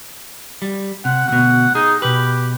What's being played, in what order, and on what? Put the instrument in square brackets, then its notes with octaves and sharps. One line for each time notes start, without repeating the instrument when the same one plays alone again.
[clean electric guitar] G3
[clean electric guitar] C3 [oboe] F#5
[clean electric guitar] D2 B2 [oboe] F#5
[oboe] D#4 [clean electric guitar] G#4
[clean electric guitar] B2 B4 [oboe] G4